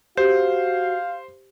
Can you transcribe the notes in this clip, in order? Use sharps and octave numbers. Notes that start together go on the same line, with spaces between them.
F#4 G4 C5 F5